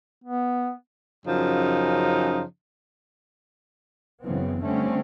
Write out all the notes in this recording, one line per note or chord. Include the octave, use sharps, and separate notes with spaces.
B3
F#2 C#3 F3 D#4
F#1 C#3 E3 B3 C4
D3 G3 A3 C4 C#4